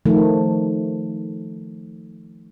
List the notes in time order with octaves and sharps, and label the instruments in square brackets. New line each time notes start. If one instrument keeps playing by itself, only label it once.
[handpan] D#3 F3 A3